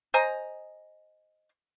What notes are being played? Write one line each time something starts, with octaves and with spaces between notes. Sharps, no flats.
C5 D#5 G#5 A#5